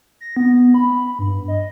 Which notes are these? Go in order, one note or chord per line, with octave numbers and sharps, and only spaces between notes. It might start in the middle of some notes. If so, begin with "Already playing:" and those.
A#6
B3
B5
G2
D#5